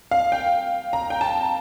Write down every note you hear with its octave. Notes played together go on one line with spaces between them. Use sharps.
F5
G5
A#5
G5
A5